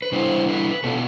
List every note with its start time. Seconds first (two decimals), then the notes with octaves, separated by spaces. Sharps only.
0.02 B4
0.12 D3 G3 B3 E4 C5
0.48 B4
0.84 B2 B3 F4 A4